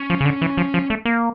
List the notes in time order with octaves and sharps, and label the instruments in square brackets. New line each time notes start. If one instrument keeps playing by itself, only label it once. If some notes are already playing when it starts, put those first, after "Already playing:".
Already playing: [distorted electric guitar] C#4
[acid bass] F3
C#3
D3
E3
F3
F3
A3
A#3